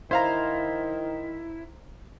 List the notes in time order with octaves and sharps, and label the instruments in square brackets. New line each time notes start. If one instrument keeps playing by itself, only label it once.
[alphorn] D#3 [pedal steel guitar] E4 [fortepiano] C5 F5 A#5